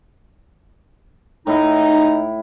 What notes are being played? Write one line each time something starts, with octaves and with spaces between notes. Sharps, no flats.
A2 D#4 E4